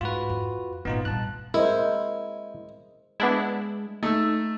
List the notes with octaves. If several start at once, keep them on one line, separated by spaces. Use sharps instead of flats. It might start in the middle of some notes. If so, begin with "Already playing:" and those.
G#2 F4 F#4 B4
F2
G#1 A#2 B3 D#4 F4
G2 A#2 A5 F#6
G#3 E4 A#4 C5
G#3 B3 D4 E4
A3 D#4 E6